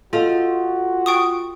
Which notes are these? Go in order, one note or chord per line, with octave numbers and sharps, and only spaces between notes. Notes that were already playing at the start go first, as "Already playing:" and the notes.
F4 F#4 A4 D#5 F5
G5 C#6 D#6